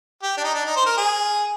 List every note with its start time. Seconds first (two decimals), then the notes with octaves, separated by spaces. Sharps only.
0.23 G4
0.37 D4
0.44 D#4
0.54 D4
0.66 D#4
0.76 C5
0.86 A#4
0.97 G#4